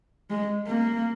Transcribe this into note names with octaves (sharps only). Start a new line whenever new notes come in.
G#3
A#3